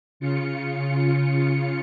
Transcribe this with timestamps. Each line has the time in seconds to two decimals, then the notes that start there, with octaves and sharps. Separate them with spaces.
0.20 C#3 F4 C#7